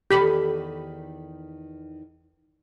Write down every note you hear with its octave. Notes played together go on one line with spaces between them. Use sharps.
E2 D#3 G4 A4 B5